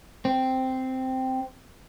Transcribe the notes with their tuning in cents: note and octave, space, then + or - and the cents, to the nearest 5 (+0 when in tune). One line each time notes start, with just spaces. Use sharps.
C4 -5